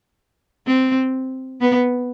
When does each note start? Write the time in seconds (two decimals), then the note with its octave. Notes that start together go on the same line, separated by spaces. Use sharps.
0.67 C4
1.61 B3